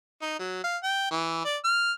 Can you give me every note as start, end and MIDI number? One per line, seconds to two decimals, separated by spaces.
0.22 0.39 63
0.39 0.60 54
0.64 0.77 77
0.83 1.06 79
1.11 1.40 52
1.45 1.57 74
1.64 1.92 89